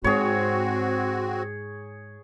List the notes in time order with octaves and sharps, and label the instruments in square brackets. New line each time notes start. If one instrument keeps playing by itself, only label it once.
[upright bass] G#2 [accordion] C4 F#4 [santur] G#4 C#5